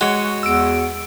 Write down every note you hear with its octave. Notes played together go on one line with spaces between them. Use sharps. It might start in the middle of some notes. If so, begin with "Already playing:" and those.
G#3 F#4 C#5 F#5
E2 E6 D7